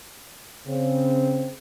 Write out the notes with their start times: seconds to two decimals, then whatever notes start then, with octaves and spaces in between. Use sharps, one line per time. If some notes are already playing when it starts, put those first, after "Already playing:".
0.67 C#3 C4